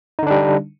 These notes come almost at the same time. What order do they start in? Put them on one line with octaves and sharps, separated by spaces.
D#4 D3 D4 G3